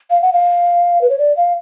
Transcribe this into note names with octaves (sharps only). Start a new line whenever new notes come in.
F5
F#5
F5
B4
C#5
D5
F5